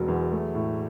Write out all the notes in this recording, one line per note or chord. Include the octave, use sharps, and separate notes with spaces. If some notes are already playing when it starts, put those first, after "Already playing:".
Already playing: E1 B2 F#3
E2
A3
A2